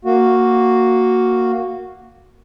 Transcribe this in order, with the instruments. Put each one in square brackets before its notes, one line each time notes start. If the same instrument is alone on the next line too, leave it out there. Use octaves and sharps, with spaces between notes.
[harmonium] A#3 F#4